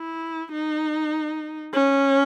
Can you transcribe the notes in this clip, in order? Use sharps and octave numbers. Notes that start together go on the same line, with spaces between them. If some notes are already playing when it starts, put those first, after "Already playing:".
Already playing: E4
D#4
C#4